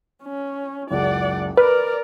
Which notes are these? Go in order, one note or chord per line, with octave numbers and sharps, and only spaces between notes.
C#4
F#1 C#2 D5 F#5
A#4 B4 D5 F6